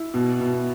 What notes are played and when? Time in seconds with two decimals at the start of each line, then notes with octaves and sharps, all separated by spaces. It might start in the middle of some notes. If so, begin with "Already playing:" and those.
Already playing: E4
0.14 B2
0.40 B2